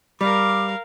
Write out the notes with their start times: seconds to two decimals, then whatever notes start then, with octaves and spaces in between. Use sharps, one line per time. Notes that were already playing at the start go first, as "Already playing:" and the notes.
0.21 G3 A#4 F5 D6